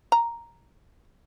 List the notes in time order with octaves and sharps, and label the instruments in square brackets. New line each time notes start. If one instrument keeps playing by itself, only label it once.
[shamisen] A#5